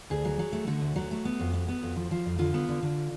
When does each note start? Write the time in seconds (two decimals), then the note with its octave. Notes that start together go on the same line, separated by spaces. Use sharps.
0.10 D2 G#4
0.25 F#3
0.39 F#3
0.53 A3
0.67 D3 F#4
0.81 D2
0.96 F#3
1.11 A3
1.25 B3
1.39 F2
1.53 B3
1.68 B3
1.83 F2
1.96 F3
2.11 F3
2.25 F2
2.39 D3 F4
2.54 B3
2.69 D3
2.83 D3